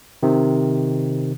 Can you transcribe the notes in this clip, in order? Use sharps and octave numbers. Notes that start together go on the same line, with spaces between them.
C3 D#3